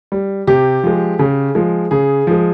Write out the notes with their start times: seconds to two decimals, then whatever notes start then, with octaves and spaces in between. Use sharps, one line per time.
0.12 G3
0.47 C3 G4
0.83 F3 G#3
1.19 C#3
1.55 F3 G#3
1.91 C#3 G#4
2.27 F3 G#3